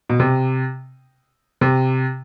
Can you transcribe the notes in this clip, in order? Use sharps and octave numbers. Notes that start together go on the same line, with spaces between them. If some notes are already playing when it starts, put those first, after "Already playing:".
B2
C3
C3